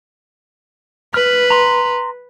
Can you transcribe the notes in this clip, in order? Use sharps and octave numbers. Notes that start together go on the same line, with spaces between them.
B4 F6
A#5 C6